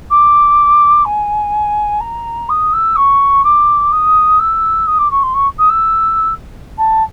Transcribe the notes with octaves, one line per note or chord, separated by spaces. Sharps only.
D6
G#5
A#5
D#6
E6
C#6
D6
D#6
E6
D#6
D6
C#6
C6
C#6
D#6
E6
A5